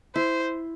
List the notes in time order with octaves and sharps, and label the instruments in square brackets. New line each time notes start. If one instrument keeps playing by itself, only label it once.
[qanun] E4 [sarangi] C5